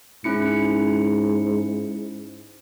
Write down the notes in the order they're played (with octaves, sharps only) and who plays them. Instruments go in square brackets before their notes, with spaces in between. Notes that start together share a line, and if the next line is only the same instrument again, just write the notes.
[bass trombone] G#2 [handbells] C#4 E4 C#7